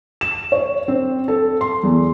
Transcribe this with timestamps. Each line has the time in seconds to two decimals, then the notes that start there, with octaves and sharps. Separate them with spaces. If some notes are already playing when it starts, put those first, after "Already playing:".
0.21 E7
0.52 C#5
0.88 C4
1.28 A4
1.61 C6
1.83 E2